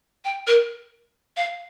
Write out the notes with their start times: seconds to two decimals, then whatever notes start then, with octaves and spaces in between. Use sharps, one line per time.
0.25 G5
0.47 A#4
1.37 F5